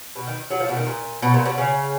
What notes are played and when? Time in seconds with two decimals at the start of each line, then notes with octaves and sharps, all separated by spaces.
0.15 B2
0.27 D#3
0.50 F#3
0.60 F3
0.69 B2
0.77 D#3
0.86 A#2
1.22 B2
1.34 A#2
1.46 B2
1.58 C#3